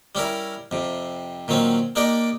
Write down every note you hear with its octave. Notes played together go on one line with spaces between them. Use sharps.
G3 C#4 E4 A#4
F2 C3
A#2 D#3 F#3 C4 C#4
A#3 D4 D#4 G4 D5 D#5